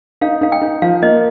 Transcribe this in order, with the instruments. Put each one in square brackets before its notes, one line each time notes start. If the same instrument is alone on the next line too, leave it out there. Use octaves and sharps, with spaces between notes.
[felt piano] D#4 [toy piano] F5
[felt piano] D#4 [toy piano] F5
[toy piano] G5
[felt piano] D#4
[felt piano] F3 [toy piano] F5
[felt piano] A#3 [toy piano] D#5